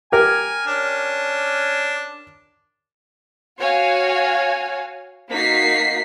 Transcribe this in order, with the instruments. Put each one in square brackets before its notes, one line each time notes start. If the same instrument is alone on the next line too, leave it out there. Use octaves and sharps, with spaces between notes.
[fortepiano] G4 A#4 [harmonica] G#5
[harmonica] C#4 D4
[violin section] F#4 C#5 F5 G#5
A#3 D#4 F#4 B6 C7